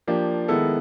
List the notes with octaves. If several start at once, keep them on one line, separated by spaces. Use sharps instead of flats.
F3 A#3 D4 G4
D#3 G#3 B3 E4 A4